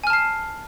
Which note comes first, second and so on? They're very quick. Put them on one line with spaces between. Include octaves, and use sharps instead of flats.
G#5 F6 A5 C7